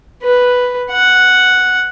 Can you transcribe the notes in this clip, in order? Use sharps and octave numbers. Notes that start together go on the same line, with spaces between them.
B4
F#5